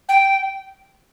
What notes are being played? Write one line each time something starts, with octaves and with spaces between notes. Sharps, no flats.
G5